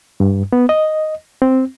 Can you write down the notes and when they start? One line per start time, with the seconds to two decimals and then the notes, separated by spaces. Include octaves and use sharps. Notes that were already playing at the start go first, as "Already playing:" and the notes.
0.20 G2
0.53 B3
0.69 D#5
1.42 C4